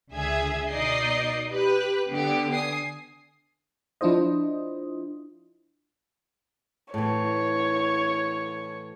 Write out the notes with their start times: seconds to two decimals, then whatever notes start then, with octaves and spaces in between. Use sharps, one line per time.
0.12 C#2 D3 G#4 E5 G#6
0.70 B2 D#4 D5 D#5 C7
1.50 G4 B4 F#6
2.08 D3 B3 G4
2.51 G#5 D#6 C7
4.01 F3 D4 E4 F4 C5 D#5
6.94 A2 E3 C#5